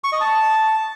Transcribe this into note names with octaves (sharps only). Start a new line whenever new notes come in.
C#6
D#5
A5